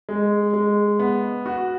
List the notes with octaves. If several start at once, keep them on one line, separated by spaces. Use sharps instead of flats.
G#3
G#3
B3
F#4